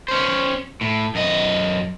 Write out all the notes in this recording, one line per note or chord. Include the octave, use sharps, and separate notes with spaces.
C#4 C5
A2
F#2 D#5